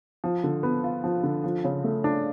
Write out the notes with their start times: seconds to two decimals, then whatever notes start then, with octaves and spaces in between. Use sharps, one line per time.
0.24 F3
0.44 D3
0.63 B3
0.84 F4
1.04 F3
1.24 D3
1.44 F3
1.64 C#3
1.84 A3
2.04 D4